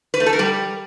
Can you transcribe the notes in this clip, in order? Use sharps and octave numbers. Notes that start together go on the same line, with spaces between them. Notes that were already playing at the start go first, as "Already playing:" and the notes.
B4
A3
A4
A#4
G3